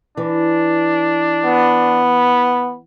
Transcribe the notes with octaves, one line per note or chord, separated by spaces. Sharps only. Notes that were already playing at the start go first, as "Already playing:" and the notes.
E3 D4
B3